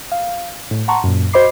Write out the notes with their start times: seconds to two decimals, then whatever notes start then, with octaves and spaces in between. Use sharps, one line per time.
0.12 F5
0.71 A2
0.88 F#5 A5 A#5 C6 C#6
1.04 F#2 A#2
1.33 F#4 C5 D#5 B5 D6 C7